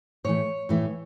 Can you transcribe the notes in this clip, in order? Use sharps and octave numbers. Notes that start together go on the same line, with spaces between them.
A2 E3 A3 C#5
A2 E3 A3